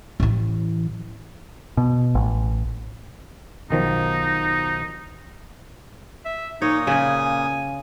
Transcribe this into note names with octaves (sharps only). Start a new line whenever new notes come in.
A1 E3
B2
A1
B1 D#3 F3 D#4
E5
A#2 A#3 D#4 C#5 D#6
C#3 G#4 G#5